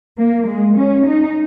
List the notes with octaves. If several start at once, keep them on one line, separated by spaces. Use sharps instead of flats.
A#3
G#3
C#4
D#4